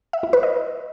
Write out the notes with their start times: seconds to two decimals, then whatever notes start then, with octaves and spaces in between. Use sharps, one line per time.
0.13 E5
0.23 E4
0.33 B4
0.43 D#5